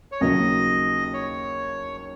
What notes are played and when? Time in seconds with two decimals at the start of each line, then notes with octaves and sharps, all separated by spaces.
0.12 C#5
0.21 D#2 C#3 F#3 D#5
1.13 C#5